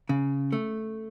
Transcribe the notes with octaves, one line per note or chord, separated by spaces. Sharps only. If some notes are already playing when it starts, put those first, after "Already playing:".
C#3
A3